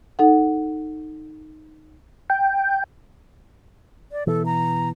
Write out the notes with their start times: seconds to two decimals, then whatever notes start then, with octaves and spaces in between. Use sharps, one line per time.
0.19 D#4 A4 F#5
2.30 G5
4.12 D5
4.27 B2 E3 A4
4.46 A#5